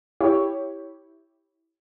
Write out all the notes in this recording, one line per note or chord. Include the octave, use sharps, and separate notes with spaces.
E4 G4 C#5